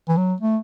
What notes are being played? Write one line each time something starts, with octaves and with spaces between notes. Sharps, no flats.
E3
F#3
A3